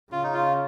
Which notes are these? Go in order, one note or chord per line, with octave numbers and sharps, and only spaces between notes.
C#3 F4
D#4
F4